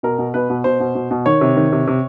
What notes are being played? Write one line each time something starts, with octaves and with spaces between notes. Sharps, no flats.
B2 A#4
B2
B2 B4
B2
B2 C5
B2
B2
B2
D#3 C#5
C3
D#3
C3
C3